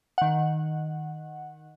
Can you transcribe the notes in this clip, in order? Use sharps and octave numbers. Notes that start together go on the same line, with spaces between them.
D#3 F#5